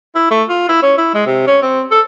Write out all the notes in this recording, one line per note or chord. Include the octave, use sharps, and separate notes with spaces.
E4
A3
F4
E4
C#4
E4
G#3
C3
C#4
C4
A4